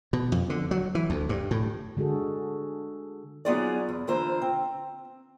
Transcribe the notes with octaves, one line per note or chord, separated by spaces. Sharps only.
B2
F2
D3
F#3
E3
D2
G2
A2
D3 G#3 F#4 G#4 A4
F#3 B3 D#4 F4 G#4 D5
E2
D3 E3 F4 C5 A#5
C4